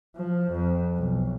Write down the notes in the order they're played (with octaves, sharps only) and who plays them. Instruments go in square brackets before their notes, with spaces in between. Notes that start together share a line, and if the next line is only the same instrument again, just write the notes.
[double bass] F3
F2
B1